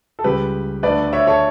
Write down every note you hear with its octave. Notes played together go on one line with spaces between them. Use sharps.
A4
C#2 C#3 G3 G4 B4
D2 D3 A3 B4 D5
C#5 E5
A4 C#5